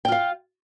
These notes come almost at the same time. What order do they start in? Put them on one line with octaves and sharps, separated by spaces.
G5 F4 F5